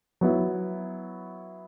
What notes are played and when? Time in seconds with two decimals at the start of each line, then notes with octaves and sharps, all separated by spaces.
0.21 F#3 B3 E4